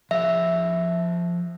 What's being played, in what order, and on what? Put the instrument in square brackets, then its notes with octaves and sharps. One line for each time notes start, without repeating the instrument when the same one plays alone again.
[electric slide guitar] F3 G#4 [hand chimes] E5